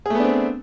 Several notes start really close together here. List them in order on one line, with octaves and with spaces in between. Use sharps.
G#4 A3 B3 D4 C4